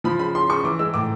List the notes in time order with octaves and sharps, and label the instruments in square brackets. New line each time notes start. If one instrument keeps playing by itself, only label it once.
[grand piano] F3 B5
C#3 B5
C#3 C6
C#3 C#6
E3 D6
G#3 E6
A2 D6